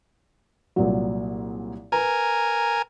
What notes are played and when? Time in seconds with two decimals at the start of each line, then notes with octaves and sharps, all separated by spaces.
0.76 C2 A#2 F#3
1.92 A#4 B4 G#5 A#5